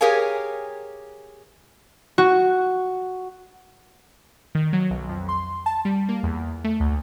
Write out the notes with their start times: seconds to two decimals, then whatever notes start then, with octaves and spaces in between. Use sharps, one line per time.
0.01 G4 G#4 A#4 C#5 F5 G#5
2.18 F#4
4.55 D#3
4.73 F#3
4.90 B1
5.09 F2
5.29 C6
5.66 A5
5.85 G3
6.09 A#3
6.23 E2
6.64 A3
6.80 D2